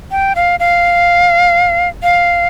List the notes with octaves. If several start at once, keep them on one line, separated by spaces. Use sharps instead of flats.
G5
F5
F5
F5